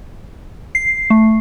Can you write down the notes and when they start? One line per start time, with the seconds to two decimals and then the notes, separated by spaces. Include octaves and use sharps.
0.75 C7
1.10 A3